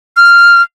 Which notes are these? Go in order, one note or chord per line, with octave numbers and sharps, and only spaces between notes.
F6